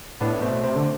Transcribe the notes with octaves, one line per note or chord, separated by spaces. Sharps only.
A2 B3 D4
B2 A3 C4
C3 A3 C4
D3